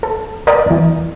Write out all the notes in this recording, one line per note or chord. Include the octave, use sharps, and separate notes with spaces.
A4
A#4 B4 D5 D#5 G5
E2 E3